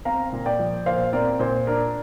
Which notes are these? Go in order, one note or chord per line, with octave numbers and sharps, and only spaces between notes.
C4 F5 A#5
A#2
D5 G5
F3
A#2 C5 F5
C4 A#4 D5
A#2 C5
D4 A#4